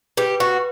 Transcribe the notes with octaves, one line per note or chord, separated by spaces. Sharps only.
G4 B4
F#4 B4